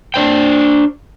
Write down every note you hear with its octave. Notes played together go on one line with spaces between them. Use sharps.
D4 C5 G5